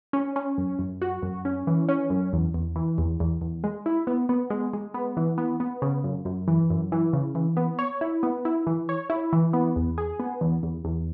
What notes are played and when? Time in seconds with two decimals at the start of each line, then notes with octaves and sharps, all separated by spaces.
0.13 C#4
0.36 C#4
0.58 F#2
0.79 F#2
1.02 F#4
1.23 F#2
1.45 C#4
1.67 E3
1.89 C#4
2.10 F#2
2.33 E2
2.54 E2
2.76 E3
2.98 E2
3.20 E2
3.41 E2
3.64 G#3
3.86 E4
4.07 B3
4.29 B3
4.50 G#3
4.73 G#3
4.94 B3
5.17 E3
5.38 B3
5.60 B3
5.82 C#3
6.04 F#2
6.25 F#2
6.48 E3
6.70 F#2
6.92 E3
7.13 C#3
7.35 E3
7.57 B3
7.79 C#5
8.01 E4
8.23 B3
8.45 E4
8.67 E3
8.89 C#5
9.10 E4
9.33 E3
9.53 B3
9.76 E2
9.98 G#4
10.20 B3
10.41 E2
10.63 E2
10.85 E2